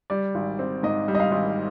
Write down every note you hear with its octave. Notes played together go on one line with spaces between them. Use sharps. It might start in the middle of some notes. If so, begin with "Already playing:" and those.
G3 D5
G#1
C4
G#2 D#5
G3
D#5
F5
G#1